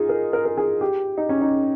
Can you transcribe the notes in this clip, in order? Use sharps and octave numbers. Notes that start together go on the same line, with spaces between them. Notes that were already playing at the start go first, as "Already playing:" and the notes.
Already playing: D#4 F4 G#4
A#4
A#4
A#4
G#4
G4
D#4
C#4
D#4